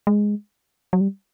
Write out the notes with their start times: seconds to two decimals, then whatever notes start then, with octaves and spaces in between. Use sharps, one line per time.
0.07 G#3
0.93 F#3
1.01 G3